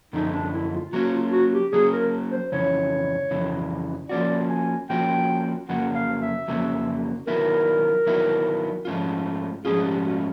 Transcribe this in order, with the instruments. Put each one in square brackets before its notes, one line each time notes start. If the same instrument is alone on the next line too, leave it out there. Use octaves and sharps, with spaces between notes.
[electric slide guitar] F#2 D3 F3 A3 [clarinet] D#4
[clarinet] D4
E4
F4
[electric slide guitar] F#3 A#3 C#4 [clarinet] F#4
[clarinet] F4
F#4
G4
[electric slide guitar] F#3 A#3 C#4 [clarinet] G#4
[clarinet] A#4
C5
[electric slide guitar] F2 C#3 E3 [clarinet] C#5
[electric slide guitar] F2 C#3 E3
[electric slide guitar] F3 A#3 C#4 F#4 [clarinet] D5
[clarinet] G#5
[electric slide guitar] F3 A#3 C#4 F#4 [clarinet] G5
[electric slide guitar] F2 C#3 F#3 A#3 [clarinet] F#5
[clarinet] F5
E5
[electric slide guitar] F2 C#3 F#3 A#3
[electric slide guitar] D#3 F#3 B3 E4 [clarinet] A#4
[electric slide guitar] D#3 F#3 B3 E4
G#2 F3 A3 C#4 F4
[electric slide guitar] G#2 F3 A3 C#4 F4 [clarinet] G#4
[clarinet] G4
F#4